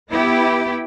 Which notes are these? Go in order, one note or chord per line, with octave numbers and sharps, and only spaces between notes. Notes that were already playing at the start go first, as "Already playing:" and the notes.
B3 E4 G4